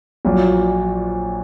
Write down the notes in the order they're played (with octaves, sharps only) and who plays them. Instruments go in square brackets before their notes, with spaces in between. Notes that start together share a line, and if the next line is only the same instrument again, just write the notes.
[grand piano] A#1 A#2 F#3